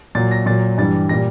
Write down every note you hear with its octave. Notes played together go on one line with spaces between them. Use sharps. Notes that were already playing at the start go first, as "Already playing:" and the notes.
A#2 F#3 A6
A#6
A#2 F#3 A6
G2 E3 G3 A6
A#2 G3 A#6